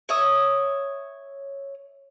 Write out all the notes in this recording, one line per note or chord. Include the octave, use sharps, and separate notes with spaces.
C#5 E5 D#6